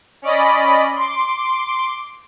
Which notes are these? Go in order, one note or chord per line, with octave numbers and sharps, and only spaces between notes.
C#4 D5 D#5 B5
C6 D6